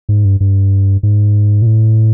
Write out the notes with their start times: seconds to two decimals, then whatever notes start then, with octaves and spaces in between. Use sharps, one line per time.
0.09 G#2
0.25 G2
0.40 G2
1.03 G#2
1.62 A#2
1.66 A2